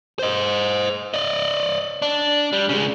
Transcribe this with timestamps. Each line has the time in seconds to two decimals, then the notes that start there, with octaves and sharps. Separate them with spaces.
0.19 C5 D#5
1.14 D5 D#5
2.02 D4
2.53 G3
2.69 C#3 G#3